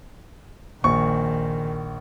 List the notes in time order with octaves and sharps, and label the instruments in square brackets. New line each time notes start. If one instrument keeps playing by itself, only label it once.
[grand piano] A#1 C#6 [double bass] D#3